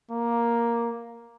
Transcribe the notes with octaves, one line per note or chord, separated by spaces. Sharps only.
A#3